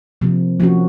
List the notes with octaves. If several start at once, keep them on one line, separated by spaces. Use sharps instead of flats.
C3 F3 A#3
F3 A#3 C#4 F#4